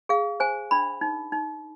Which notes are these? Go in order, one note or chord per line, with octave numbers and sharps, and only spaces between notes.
G#4 F5
C5 G#5
D4 B5
D#4
D#4